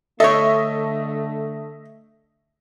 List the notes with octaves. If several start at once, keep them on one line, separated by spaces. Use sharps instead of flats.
D3 A3 A4 C#5 D#5 E5